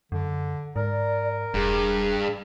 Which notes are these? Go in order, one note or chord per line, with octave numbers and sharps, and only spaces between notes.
F#2 D3
G#2 A#4 D5
E1 G2 G#4